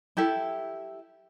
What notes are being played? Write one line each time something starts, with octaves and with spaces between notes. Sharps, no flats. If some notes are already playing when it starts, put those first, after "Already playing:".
E4 G4 A4 E5